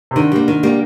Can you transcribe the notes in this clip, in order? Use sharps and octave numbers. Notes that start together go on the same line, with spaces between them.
C3
D3 D#3
G3 A#3
D#3
G3 A#3